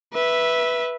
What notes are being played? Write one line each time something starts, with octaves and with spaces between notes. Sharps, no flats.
B4 E5